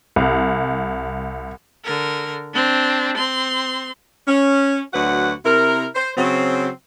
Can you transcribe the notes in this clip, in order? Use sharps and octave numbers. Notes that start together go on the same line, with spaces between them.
C2
D3 A#4
C4 D4
C4 C6
C#4
D2 F#3 F#4 B4 F#5
C3 E4 A#4
C5
C#3 F#3 C4